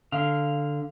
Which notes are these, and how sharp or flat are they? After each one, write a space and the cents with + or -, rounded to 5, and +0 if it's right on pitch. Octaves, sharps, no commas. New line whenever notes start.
D3 +5 F5 +0